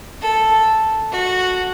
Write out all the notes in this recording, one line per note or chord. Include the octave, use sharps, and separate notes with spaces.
A4
F#4